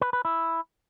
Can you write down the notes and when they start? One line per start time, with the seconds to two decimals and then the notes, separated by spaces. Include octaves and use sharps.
0.01 B4
0.13 B4
0.25 E4